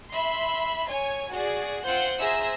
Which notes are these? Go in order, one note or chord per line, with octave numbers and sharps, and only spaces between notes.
E5 B5 C6
C#5 G#5
F#4 G#4 D5
C4 F4 C5 F#5 G6
G#4 C5 E5 A#5 E6